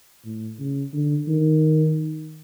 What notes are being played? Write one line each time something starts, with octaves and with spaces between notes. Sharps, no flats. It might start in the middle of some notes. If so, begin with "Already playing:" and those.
A2
C#3
D3
D#3